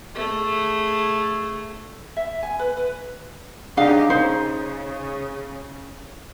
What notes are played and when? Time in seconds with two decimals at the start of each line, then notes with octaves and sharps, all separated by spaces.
0.15 A3 G#4
2.17 E5
2.43 G#5
2.59 B4
2.77 B4
3.77 C#3 D4 D#4 G4 G#4 F5
4.10 C#3 D#4 C5